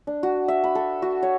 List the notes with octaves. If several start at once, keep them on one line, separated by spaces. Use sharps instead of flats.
D4
F#4
E5
B5
A4
F#4
C#5